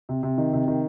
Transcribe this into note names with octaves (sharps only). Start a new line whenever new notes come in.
C3
C3
D#3
C3
D#3